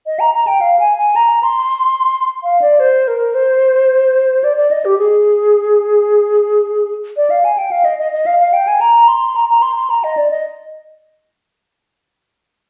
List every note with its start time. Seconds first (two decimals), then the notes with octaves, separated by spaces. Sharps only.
0.07 D#5
0.20 A#5
0.34 A#5
0.47 G5
0.61 F5
0.79 G#5
0.98 G#5
1.16 A#5
1.43 C6
2.43 F5
2.62 D5
2.80 C5
3.08 A#4
3.34 C5
4.44 D5
4.57 D5
4.71 D#5
4.85 G4
4.98 G#4
7.17 D5
7.30 F5
7.44 G#5
7.58 G5
7.71 F5
7.85 D#5
7.99 D#5
8.13 D#5
8.26 F5
8.40 F5
8.53 G5
8.67 G#5
8.81 A#5
9.08 C6
9.36 A#5
9.49 A#5
9.62 C6
9.76 C6
9.90 A#5
10.04 D#5
10.17 D5
10.31 D#5